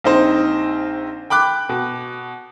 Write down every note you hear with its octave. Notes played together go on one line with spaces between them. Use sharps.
A#1 C4 D#4 C5
G5 B5 D6 F#6
B2